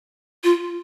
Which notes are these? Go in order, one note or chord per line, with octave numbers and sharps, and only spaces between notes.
F4